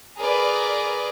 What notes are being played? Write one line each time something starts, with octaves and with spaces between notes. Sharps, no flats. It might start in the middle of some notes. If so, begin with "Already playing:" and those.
G#4 A#4 B4 D5